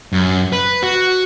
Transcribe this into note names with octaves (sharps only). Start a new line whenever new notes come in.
F#2
B4
F#4